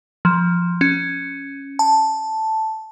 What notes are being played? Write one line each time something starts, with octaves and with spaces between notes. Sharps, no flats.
F3
C#4
A5